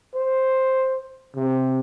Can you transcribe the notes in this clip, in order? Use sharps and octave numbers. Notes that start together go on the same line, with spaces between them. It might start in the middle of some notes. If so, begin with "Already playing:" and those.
C5
C3